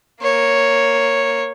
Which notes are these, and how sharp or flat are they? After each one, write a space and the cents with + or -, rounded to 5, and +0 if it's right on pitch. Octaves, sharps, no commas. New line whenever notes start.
A#3 +0 C#5 -5